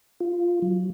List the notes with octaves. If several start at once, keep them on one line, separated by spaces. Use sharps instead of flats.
F4
F#3